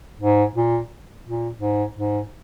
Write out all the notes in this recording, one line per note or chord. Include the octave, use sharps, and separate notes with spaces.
G#2
A#2
A#2
G#2
G#2